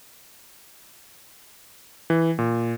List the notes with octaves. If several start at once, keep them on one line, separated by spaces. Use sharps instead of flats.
E3
A#2